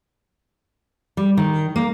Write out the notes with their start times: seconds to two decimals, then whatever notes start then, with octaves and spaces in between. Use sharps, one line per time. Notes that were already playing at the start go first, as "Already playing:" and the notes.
1.17 G3
1.37 D#3
1.76 A#3